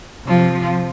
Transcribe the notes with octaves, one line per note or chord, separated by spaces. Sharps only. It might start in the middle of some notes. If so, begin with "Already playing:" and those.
C3 F3